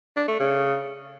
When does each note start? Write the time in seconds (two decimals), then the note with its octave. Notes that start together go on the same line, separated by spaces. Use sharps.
0.17 D4
0.28 A3
0.40 C#3